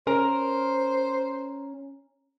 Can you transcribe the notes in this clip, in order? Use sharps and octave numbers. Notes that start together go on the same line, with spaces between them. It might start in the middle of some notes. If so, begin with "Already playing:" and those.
C#4 A#4 C5